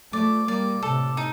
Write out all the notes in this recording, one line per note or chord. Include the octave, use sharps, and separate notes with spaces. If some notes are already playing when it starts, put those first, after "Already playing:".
F3 A3 D5
G3 A#3 D5
A2 C3 A4
D#4